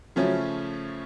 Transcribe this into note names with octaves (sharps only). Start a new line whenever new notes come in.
C#3 F3 F#3 A3 C#4